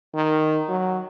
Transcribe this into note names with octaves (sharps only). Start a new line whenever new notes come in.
D#3
F#3